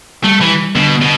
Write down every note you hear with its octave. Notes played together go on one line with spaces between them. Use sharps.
G3 A3
E3
B2 D3
B2